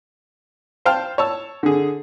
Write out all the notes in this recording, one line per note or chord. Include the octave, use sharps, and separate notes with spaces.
C5 F5 G5 A5 F6
C#5 A5 E6
D3 G#4